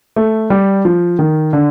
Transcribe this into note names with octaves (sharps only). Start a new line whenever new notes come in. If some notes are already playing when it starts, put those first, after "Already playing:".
A3
G3
F3
D#3
D3